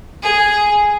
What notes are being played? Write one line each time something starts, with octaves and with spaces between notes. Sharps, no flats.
G#4